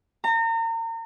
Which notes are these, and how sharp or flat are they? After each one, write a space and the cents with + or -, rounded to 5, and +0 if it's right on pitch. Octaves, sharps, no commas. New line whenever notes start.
A#5 -35